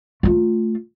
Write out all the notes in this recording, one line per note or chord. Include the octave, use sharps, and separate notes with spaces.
A3 F4